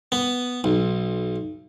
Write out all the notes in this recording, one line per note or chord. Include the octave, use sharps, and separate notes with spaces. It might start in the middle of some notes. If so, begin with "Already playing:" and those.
B3
B1